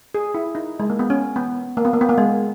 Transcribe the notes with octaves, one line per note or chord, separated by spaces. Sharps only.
G#4
E4
D#4
G#3
A#3
B3
C#4
B3
A#3
B3
A#3
B3
A#3
G#3